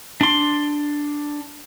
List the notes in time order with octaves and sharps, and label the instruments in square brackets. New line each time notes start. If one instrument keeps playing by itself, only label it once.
[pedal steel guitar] D4 C6